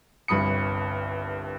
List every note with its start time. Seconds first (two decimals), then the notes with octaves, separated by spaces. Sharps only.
0.28 G1 C2 G2 B5 D#6 C#7